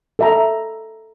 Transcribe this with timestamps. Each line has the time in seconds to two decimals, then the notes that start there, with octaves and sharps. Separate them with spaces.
0.19 A4 E5 A#5